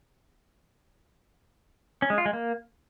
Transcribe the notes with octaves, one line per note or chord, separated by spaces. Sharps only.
C#4
G#3
F4
G#3
A#3